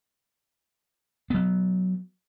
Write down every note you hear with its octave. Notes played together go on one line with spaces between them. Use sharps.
F#3 B3